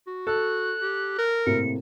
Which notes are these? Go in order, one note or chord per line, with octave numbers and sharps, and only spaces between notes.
F#4
A4 F#6
G4
A#4
A2 C3 A#3 C#7